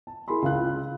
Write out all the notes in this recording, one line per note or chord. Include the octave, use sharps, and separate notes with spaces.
A5
E4 G#4 A#4 G#5 B5 C6
C#2 C#3 F4 F5 F#6